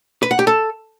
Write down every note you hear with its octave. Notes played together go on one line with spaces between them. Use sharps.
B4
F#5
G4
A4